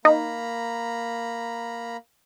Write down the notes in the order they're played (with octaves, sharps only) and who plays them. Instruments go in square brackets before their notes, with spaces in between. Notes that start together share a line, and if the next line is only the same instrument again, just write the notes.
[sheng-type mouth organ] A#3 A#5 B5 [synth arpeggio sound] D#4